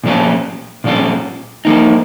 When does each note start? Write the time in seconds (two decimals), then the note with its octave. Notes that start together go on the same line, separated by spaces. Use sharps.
0.04 A#2 F3 C#4 F4
0.84 A#2 F3 C#4 F4
1.65 F3 A#3 D#4